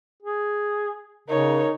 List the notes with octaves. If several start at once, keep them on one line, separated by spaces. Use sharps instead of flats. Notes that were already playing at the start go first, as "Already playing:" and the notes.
G#4
C#3 D#4 A#4 C#5